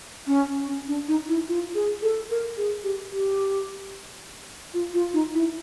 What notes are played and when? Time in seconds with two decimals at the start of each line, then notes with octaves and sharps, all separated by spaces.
0.27 C#4
0.68 C#4
0.88 D4
1.08 D#4
1.28 E4
1.48 F4
1.75 G#4
2.02 A4
2.30 A#4
2.57 G#4
2.84 G4
3.11 G4
4.74 F4
4.94 F4
5.14 D#4
5.35 E4